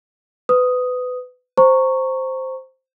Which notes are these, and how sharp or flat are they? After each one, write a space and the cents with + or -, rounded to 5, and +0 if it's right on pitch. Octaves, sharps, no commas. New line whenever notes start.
B4 +25 D#6 +0
C5 +0 A#5 -20 C#6 +0